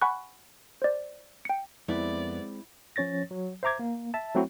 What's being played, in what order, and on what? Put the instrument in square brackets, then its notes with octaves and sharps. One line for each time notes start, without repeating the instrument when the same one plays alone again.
[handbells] F#5 G#5 B5 C#6 F#6
C5 D5
G5 C#7
[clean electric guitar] F2 B3 [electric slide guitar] G#3 C4 [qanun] E4 [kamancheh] D5
[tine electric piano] F3 C#4 C#5 A6 A#6
F#3
C5 E5 A#5 D6 G#6
A#3
E5 A5
F#3 A3 C4 E4 F#4